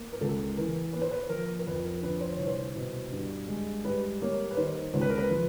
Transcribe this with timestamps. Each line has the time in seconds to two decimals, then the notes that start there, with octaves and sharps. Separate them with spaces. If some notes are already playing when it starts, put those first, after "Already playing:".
Already playing: A#3
0.13 A#4
0.21 C#2 A4
0.57 E3 A#4
0.93 A#3 B4
1.02 C5
1.11 B4
1.29 F3 A#4
1.59 A#4
1.67 F2 B4
1.84 A#4
2.02 D3 B4
2.21 C5
2.35 C2 C#5
2.47 C5
2.75 B2
3.11 G2
3.48 G#3
3.85 G3 B4
4.22 A#3 C#5
4.51 B4
4.57 D#3 C5
4.93 C#2 C5
5.01 B4
5.10 A#4
5.18 B4
5.30 F3